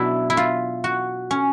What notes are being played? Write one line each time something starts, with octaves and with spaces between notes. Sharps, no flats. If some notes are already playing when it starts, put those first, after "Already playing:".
Already playing: B2 F#3 D4 E4
E4
F4
F#4
C#4